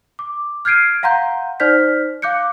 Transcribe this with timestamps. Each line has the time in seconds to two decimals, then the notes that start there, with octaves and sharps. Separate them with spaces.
0.19 D6
0.65 F6 G6 G#6 C7 D7 D#7
1.03 F5 F#5 A#5 C6 G6
1.60 D#4 C5 D5 F6 G6 B6
2.22 F5 D6 F#6 G6 C#7